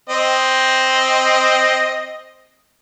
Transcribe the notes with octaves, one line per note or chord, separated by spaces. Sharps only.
C4 D#5